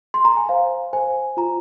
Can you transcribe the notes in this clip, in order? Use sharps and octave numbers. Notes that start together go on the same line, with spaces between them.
C6
A#5
G#5
C5 F5
C5 G#5
F4 A#5